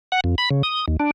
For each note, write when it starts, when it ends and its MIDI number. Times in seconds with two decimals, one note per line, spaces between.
0.12 0.20 78
0.24 0.35 41
0.38 0.49 83
0.50 0.63 49
0.63 0.85 87
0.88 0.96 39
1.00 1.11 62